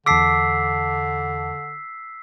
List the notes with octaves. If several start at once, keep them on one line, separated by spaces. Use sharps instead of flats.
E2 D3 A5 D6 E6 B6 C7